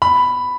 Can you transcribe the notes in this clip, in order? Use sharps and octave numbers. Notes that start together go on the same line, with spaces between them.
B5